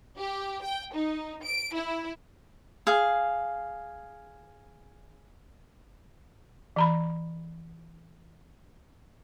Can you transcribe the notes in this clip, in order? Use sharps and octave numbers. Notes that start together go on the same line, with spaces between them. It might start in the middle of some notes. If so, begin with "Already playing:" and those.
G4
G5
D#4
D7
E4
G#4 F5
E3 A#5 B5